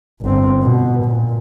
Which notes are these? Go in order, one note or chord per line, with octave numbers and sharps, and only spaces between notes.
G1 C4
B2
A#2